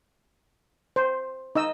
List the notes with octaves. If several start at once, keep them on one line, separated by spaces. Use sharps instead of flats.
C5
D#4 D#5 E6